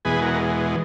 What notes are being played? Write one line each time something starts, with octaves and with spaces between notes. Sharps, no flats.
E2 B2 G#3 G#4 B4
F#4 A#4
A#4